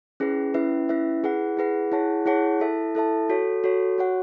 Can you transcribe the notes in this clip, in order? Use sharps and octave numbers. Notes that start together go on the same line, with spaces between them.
C#4 E4 G#4 B4
C#4 E4 B4 E5
C#4 E4 B4 E5
E4 G#4 B4 F#5
E4 G#4 B4 F#5
E4 G#4 C#5 F#5 A5
E4 G#4 C#5 F#5 A5
E4 A4 E5 A5
E4 A4 E5 A5
F#4 A4 C#5
F#4 A4 C#5
F#4 C#5 F#5